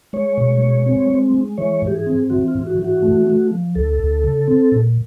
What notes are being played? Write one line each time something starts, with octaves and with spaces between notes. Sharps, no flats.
G#3 C#5
B2
G#3
C4
G#3
G#3
E3 C#5
G#2
G4
G#4
C4
E3 F#4
F4
G#2
F#4
E3
F#4
A3
A3
F3
D2 A4
D2
C#3
C4
A#2